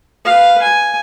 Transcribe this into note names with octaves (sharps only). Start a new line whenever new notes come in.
B4 F5
G#5